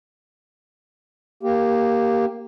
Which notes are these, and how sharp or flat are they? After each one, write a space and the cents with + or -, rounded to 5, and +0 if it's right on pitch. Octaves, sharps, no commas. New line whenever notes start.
A#3 +0 G4 +0